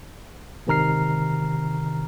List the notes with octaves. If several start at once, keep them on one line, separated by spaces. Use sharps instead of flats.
G#1 C3 D#3 A#5 F6 C7